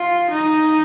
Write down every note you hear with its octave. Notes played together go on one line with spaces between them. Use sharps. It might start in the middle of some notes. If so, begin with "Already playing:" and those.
Already playing: F4
D#4